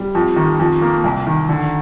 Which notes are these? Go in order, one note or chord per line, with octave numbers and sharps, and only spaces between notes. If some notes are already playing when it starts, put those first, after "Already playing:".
Already playing: G3
F2
D#3
F2
A#3
C2
D#3
D3